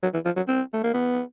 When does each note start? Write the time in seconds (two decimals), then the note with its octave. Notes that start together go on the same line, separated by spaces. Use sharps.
0.03 F#3
0.14 E3
0.25 F3
0.36 F#3
0.48 C4
0.73 A3
0.84 A#3
0.94 B3